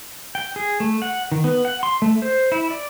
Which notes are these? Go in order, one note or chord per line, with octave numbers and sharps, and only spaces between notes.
G5
G#4
A3
F#5
D#3
B3
F#5
C6
A3
C5
E4
D5